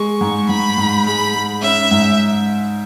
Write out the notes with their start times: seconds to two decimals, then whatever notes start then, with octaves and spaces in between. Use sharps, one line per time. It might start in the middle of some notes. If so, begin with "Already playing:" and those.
Already playing: G#3 C#6
0.21 G#2
0.49 G#2 B5
0.78 G#2
1.06 G#3 B5
1.34 G#3
1.62 C#4 E5
1.91 G#2